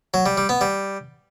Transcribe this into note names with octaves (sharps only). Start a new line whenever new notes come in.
F#3
G3
G3
B3
G3